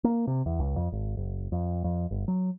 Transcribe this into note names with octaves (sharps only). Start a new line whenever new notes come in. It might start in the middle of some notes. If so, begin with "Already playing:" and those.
A#3
C3
E2
C#2
F2
G#1
F#1
F2
F2
G1
F#3